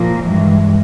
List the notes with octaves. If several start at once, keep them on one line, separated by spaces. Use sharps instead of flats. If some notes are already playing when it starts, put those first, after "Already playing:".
Already playing: A#2 F3 A#3
G2 E3 G#3